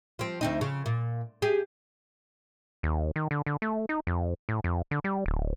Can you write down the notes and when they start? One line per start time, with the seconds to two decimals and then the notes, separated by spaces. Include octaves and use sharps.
0.19 F3 C4
0.41 D2 C4 D#4
0.61 C#3
0.86 A#2
1.42 G4 G#4
2.83 D#2
3.16 D#3
3.31 D3
3.46 D3
3.62 A3
3.89 D#4
4.07 F2
4.49 A2
4.64 F2
4.91 D3
5.04 G3
5.26 D1